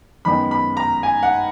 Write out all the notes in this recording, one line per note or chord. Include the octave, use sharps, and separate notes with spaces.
F#2 D#3 G#3 B3 B5
B5
A#5
G#5
F#5